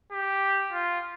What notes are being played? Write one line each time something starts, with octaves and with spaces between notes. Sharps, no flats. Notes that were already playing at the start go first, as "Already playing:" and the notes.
G4
F4